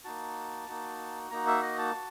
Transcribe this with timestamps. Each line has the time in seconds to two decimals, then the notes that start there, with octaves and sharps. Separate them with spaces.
0.04 A#3 D#4 F#4 A5
0.68 A#3 D#4 F#4
1.31 A#3 D#4 F#4 A#5
1.47 E5
1.63 D#5
1.78 A5
1.95 F#4